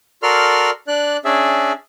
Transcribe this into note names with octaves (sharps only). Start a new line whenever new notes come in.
F#4 A4 A#4 D5 C6 F6
D4 D5 F#6
C#4 D4 G#4 D5 E5